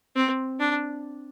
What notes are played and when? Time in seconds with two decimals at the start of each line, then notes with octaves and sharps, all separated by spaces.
0.16 C4
0.60 D4